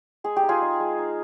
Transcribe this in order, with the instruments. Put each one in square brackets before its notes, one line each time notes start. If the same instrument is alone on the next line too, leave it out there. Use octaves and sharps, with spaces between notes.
[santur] G#3 G#4
G4
D#4
F4 G#4
D#4
G#3
D#4